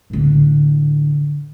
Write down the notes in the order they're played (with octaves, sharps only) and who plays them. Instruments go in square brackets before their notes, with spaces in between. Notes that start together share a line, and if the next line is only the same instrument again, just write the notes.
[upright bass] A2 D3